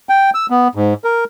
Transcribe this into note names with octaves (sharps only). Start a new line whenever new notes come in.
G5
E6
B3
G#2
A#4